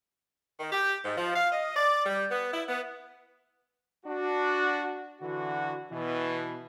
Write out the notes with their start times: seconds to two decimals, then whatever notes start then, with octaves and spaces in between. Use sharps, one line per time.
0.60 D#3
0.73 G4
1.05 G#2
1.17 F3
1.36 F5
1.51 D#5
1.76 D5
2.06 G3
2.31 B3
2.53 E4
2.68 B3
4.06 D4 F#4
5.20 D3 E3 F#4
5.91 B2 E3